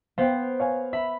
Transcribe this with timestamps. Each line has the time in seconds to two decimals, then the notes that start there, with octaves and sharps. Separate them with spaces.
0.18 B3 C5 F5 G5
0.59 C#5 F5 G#5
0.93 E5 B5